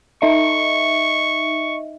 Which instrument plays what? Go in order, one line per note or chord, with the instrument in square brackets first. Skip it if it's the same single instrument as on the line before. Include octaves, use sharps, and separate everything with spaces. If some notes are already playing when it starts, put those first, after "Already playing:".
[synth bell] D#4 D#5 E5 [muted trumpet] C#6